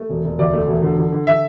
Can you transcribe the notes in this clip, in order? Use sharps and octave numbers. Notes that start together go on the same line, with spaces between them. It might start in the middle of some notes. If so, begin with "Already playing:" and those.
Already playing: A3
E1
E1
D2 D5
A3
E1
D3
D3
D3
D3 E5